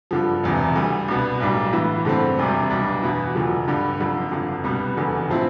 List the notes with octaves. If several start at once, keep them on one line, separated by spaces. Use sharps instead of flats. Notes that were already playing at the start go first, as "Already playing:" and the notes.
G2 D3 F3
E1 E2 C3
D2 D3 G3
C2 B2 B3
B1 A2 G3 D4
A2 E3 B3
G2 D3 A3 C4
E1 D2 C3 G3 D4
B1 B2 G3 D4
E2 B2 B3 E4
E1 D2 D3 F3
G2 D3 G3
F1 F2 D3
G1 F2 D3
C2 B2 G3 B3
F1 E2 D3
A2 F3 C4 E4